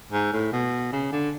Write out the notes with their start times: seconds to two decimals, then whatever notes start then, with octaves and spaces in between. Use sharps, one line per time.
0.12 G#2
0.33 A2
0.53 B2
0.93 C#3
1.12 D3